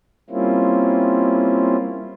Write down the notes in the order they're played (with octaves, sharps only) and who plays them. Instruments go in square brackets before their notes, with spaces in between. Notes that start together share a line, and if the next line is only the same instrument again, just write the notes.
[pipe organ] G3 A#3 C4 C#4 E4 F4